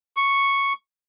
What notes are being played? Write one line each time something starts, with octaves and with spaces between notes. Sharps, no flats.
C#6